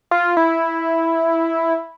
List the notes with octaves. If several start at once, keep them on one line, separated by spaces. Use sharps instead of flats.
F4
E4